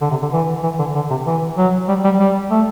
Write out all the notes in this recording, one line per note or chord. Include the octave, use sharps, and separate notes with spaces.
D3
C3
D3
E3
E3
D3
D3
C3
E3
F#3
G3
G3
G3
A3